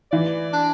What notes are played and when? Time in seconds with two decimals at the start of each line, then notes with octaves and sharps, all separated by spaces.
0.12 E3 D5
0.52 D4